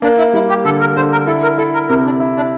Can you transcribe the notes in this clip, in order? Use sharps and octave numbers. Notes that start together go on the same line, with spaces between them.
A#3 D4
E4
G3 E4
G4
D3 A4
A#4
D3 C5
A#4
E4 A4
A#4
E4 A4
A#4
C3 A#4
D4
E4
D4